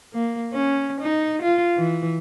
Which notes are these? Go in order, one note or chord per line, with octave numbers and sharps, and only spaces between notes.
A#3
C#4
D#4
F4
E3